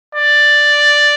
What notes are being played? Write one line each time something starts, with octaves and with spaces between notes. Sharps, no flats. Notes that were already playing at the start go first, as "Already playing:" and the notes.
D5